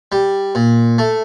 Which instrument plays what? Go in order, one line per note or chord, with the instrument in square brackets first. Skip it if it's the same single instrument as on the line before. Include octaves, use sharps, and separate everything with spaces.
[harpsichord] G3
A#2
A3